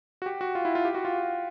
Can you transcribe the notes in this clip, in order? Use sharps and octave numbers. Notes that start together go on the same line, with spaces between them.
F#4
G4
F#4
F4
E4
F4
G4
F#4
F4